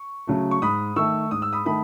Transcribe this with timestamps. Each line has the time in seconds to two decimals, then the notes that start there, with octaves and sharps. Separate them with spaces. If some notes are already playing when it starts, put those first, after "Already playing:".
Already playing: C#6
0.27 C#3 F#3 A3
0.51 C#6
0.62 G#2 B5 D#6
0.96 D#3 A3 C#6 E6
1.31 G#2 D#6
1.42 E6
1.53 B5 D#6
1.65 D#3 A3 B5 D#6